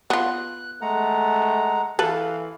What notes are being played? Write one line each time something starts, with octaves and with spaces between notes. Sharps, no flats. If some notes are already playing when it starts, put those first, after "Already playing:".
B3 F4 F#6
G#3 A3 F#5 A#5
E3 A4 B4 F5